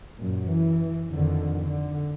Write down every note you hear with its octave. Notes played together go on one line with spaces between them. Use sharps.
F#2 A#2
E3
F2 D3 D#3
D3